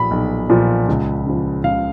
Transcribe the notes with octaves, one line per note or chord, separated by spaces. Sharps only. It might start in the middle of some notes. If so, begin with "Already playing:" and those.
Already playing: B1 A#2 F3 B5
B1
A#2 F3
C#2
C#3 F3
C#2 F5